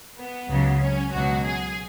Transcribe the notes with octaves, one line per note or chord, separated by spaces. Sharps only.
B3
C#2 C#3 F#3
C#4
C#2 B2 F#3 F#4
G#4